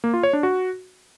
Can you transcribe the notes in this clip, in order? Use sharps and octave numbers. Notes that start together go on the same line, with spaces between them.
A#3
F4
C#5
D4
F#4